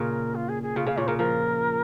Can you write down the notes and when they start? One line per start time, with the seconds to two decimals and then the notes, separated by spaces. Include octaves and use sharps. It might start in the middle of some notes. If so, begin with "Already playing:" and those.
Already playing: A#2 C#3 A#4
0.35 F4
0.49 G#4
0.63 G#4
0.76 C#3 F4
0.87 C#3 F5
0.97 A#2 C#5
1.07 C#3 A#4
1.18 F3 A#4